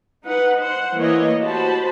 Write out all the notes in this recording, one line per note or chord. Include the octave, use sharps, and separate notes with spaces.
D#4 B4 F#5
C5 F#5
E3 A3 A#3 C#5 D#5
F#4 G4 C5 A5 B5